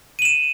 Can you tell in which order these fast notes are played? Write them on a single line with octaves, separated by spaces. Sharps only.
D#7 F#7 E7